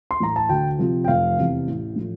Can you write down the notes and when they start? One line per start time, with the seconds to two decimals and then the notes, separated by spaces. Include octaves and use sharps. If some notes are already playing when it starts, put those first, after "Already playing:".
0.11 C6
0.20 A2 E3 A#5
0.36 A5
0.49 D2 G5
0.79 C3 F3
1.04 G5
1.08 F1 F5
1.38 E2 C3 E3
1.68 A1
1.96 A2 F3